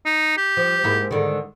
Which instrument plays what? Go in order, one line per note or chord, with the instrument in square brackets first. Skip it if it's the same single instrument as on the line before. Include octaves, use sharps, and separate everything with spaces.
[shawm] D#4
G4
[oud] F3
G#2 A#3 E4
G#2 D3 D#3